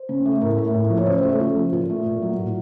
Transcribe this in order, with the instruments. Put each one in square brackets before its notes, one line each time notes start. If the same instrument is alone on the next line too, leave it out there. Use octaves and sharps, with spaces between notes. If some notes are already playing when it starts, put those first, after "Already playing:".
Already playing: [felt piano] C5
C#3
A3
A2 A#4
A3
A2
F3
C#5
C#3 C5
C5
A3
A4
C#3 F4
F3
A#2 F4
A3
A#2
F#3
A2 F4